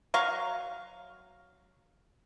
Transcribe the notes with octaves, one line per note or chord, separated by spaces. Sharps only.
F#3 F5 C#6